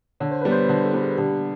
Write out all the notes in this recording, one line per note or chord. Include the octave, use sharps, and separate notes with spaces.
D3 C#5
C5
G3 B3 B4
C5
D3
A4
G3 B3
G#4
D3 G4